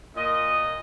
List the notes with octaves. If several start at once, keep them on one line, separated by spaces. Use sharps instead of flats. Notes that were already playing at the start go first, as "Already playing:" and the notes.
A#2 D#5